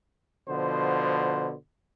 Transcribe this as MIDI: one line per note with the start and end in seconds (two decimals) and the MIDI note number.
0.46 1.52 47
0.46 1.52 50
0.46 1.52 53
0.46 1.52 72